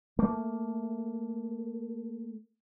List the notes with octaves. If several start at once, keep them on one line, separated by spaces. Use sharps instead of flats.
A3 A#3